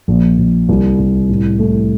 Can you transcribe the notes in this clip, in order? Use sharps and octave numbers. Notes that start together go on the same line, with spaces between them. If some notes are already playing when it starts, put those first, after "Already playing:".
A#1
A#1
C2
C2
A2
A3